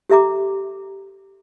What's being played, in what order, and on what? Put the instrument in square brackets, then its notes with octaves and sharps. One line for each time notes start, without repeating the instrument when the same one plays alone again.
[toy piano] G4 A4 E5 A#5 D6